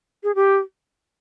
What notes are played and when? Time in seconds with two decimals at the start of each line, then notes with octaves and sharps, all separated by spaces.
0.24 G#4
0.35 G4